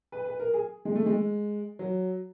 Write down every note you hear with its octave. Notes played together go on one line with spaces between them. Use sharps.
B4
B4
A#4
G#4
G#3
A3
G#3
F#3